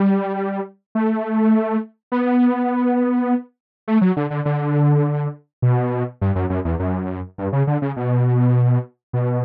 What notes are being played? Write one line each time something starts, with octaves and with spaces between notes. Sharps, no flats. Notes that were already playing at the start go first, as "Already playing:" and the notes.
Already playing: G3
A3
B3
A3
F#3
D3
D3
D3
B2
G2
F#2
F#2
E2
F#2
G2
C#3
D3
C#3
B2
B2